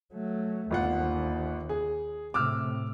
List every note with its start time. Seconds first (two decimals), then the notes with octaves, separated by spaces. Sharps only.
0.14 F#3 A3
0.71 G1 D#2 F4 F#5
1.69 G#4
2.34 A2 C3 D6 E6 F6